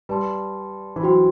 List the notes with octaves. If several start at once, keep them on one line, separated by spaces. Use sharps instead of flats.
G3 B4 D5 A5 C6
E3
F#3 D4 F#4 C5 G5 C6